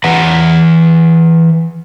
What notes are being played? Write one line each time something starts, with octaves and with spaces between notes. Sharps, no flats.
E3 B4 F#5 A#5